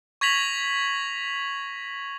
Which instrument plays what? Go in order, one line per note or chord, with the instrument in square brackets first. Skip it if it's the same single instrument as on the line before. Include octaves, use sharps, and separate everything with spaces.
[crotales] C#6 G#6 A#6 B6 F7 F#7